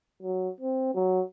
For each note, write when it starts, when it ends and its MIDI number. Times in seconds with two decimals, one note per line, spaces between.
0.22 0.49 54
0.61 0.93 60
0.95 1.22 54